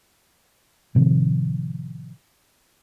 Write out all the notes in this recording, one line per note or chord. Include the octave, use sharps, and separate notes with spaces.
A2 C3 D#3 F3